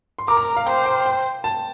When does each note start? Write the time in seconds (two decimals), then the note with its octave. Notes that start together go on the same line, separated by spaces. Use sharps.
0.18 C6
0.28 A#4 D6
0.37 A#5
0.57 F5
0.67 C5 G5
0.86 G5
1.06 G5
1.44 A5